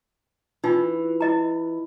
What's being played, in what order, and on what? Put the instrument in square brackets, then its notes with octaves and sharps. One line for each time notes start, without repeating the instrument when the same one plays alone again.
[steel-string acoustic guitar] E3 [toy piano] D4 D#4 F4
[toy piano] E4 D#5 A#5